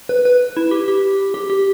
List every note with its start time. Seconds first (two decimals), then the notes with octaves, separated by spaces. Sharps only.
0.09 B4
0.25 B4
0.57 E4
0.71 G4
0.88 G4
1.34 G4
1.50 G4